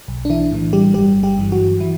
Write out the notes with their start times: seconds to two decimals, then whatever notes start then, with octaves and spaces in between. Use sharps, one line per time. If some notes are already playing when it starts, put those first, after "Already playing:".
0.08 B1
0.25 D4
0.30 E3 E4
0.52 A2 E3
0.73 G3 G4
0.94 G1 G3 G4
1.23 G3 G4
1.38 G2 E3
1.52 F#3 F#4
1.80 E3 E4